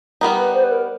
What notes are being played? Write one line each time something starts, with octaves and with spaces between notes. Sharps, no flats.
G3 B3 D#4 A#4
B4
C5
B4
A#4